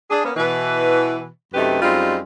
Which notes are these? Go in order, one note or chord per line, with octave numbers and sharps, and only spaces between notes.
D4 G#4
A#3 B3 C#4
B2 E3 B4
F#2 C3 A3 D#4 G4 B4
F#2 G3 G#3 C4 D#4 F4